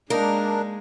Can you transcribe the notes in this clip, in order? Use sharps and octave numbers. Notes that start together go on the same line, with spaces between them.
G#3 A#3 D4 D#4 A#4